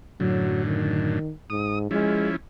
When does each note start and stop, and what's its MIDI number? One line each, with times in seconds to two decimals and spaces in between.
0.20 1.19 42
0.20 1.19 45
0.20 1.19 50
0.20 0.65 54
0.65 1.32 51
1.50 1.87 44
1.50 1.79 87
1.91 2.36 53
1.91 2.29 56
1.91 2.36 61
1.91 2.36 64